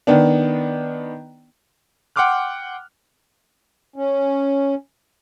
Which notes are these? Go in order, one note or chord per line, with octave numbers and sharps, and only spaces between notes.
D#3 B3 D4
F#5 G5 C6 D6 F6 F#6
C#4